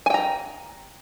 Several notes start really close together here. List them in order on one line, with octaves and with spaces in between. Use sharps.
G#5 G5 A#5